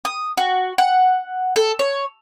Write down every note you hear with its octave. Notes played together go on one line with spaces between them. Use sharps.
D#6
F#4
F#5
A4
C#5